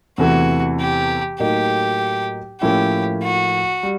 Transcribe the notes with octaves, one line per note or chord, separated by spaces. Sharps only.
E2 C3 E3 A3 F#4
G4
A2 F#3 A#3 D#4 G4
A2 F3 A#3 C#4 E4 G4
F#4
G3